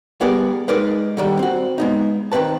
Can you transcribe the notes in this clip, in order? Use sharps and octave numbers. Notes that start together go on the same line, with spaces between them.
G3 B3 G#4 A#4 D5
G#3 D#4 A#4 B4 D5
D3 D#3 G3
C4 F#4
G#3 B3 D#4
D#3 E3 C4 B4 A5